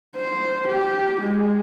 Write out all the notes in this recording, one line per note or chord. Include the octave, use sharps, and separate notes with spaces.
C5
G4
G#3